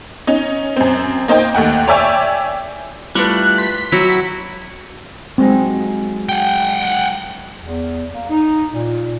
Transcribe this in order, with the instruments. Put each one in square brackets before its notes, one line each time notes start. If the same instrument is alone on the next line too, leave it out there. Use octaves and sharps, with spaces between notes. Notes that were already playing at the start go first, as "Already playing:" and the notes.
[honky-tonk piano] C#4 D#4
F#2 C4
A#3 D#4 C5 D#5 G5
D#2 A3 F#5 G5
C#5 D5 E5 G5 G#5 C#6
[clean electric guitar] G3 A3 [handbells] E4 F4 B4 [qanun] G5 C#6 [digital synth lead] F#6
[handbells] C6 [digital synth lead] B6
[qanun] F#3 G5 A#5 [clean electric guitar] E4 F#4
[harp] F#3 G#3 D#4 [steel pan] C4
[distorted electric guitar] F#5 G5
[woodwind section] E2
A#3
D#4
A#2